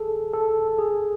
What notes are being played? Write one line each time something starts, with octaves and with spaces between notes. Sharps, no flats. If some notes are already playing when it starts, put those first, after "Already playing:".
Already playing: G#4 A4
A4
G#4